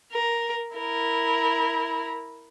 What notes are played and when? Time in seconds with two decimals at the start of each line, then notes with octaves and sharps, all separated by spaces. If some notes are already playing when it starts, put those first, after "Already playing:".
0.12 A#4
0.76 E4 A#4